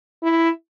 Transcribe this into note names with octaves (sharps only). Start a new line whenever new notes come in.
E4